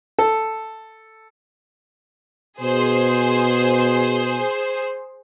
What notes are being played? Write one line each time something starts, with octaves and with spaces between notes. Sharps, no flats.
A4
B2 G#4 C5